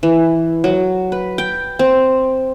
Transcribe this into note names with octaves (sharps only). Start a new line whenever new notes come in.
E3
F#3
B4
G5
C4